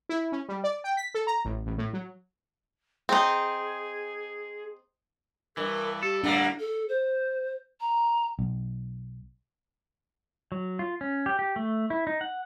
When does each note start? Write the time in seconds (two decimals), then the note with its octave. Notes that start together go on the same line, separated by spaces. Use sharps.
0.09 E4
0.32 C#4
0.49 G3
0.64 D5
0.84 G5
0.97 B6
1.14 A4
1.27 A#5
1.45 A1
1.66 A1
1.78 A2
1.93 F#3
3.09 C4 D#4 G#4
5.57 G2 E3 A#4
6.03 G4 A4
6.24 A2 G3 A#3 D4 F#5
6.59 A4
6.88 C5
7.80 A#5
8.39 B1
10.52 F#3
10.79 F4
11.01 C#4
11.26 G4
11.39 G4
11.56 A3
11.90 E4
12.07 D#4
12.21 F#5